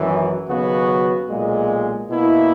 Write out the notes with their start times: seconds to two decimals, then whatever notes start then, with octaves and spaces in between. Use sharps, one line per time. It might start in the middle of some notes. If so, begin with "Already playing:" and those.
Already playing: G#1 F#2 E3
0.47 D#2 C#3 F#3 B3 F#4
1.28 B1 A#2 G#3
2.09 B2 A#3 E4